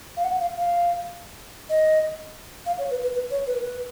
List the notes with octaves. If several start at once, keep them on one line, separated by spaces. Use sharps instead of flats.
F5
F#5
F5
F5
D#5
F5
C#5
B4
B4
B4
C#5
B4
A#4
B4